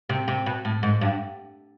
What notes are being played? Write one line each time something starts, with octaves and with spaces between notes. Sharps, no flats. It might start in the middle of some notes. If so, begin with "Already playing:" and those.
C3
C3
B2
A2
G#2
G2